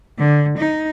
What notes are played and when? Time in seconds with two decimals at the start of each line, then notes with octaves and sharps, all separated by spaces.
0.18 D3
0.57 D#4